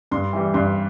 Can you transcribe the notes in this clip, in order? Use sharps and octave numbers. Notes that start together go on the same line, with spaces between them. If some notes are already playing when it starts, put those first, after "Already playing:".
G2 C6
E3 G3
G2 C6